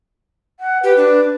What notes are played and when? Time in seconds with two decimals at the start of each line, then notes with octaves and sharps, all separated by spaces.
0.60 F#5
0.84 G4 B4
0.97 D4